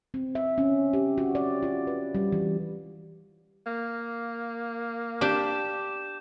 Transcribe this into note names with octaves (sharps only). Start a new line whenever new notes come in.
C4
E5
C#4
G4
F#4
D5
F4
B4
G3
E3
A#3
D4 G4 D6 G6 E7